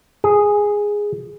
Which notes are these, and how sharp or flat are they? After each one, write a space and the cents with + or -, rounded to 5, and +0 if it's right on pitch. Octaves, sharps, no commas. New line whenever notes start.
G#4 -5